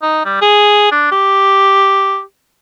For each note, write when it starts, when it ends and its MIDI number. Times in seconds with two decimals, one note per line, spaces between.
0.02 0.24 63
0.25 0.38 55
0.42 0.91 68
0.92 1.09 62
1.12 2.21 67